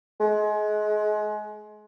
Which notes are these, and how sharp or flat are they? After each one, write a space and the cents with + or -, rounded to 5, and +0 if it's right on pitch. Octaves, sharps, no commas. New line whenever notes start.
G#3 +30